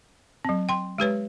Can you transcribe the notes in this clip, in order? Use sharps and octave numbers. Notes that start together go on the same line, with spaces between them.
F#3 C4
G5 C6
G#3 G4 B4 C#5